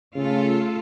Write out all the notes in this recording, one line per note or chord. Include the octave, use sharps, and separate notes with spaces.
C#3 A3 F4 A4